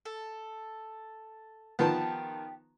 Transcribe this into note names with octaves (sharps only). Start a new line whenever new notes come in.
A4
D#3 F3 B3 G4 A5